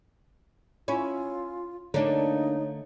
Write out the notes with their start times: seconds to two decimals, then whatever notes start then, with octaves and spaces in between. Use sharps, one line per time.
0.88 C#4 E4 F4
1.94 D3 A3 A#3 D4 D#4 C#5